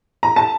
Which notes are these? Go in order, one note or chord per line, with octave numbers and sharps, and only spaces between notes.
A#5
A5